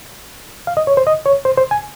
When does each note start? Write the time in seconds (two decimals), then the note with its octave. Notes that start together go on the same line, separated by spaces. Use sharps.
0.67 F5
0.77 D#5
0.87 C#5
0.97 C5
1.07 D#5
1.26 C#5
1.45 C5
1.58 C5
1.71 G#5